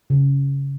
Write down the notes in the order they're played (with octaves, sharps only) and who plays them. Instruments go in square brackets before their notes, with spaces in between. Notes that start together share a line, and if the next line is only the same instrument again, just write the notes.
[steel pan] C#3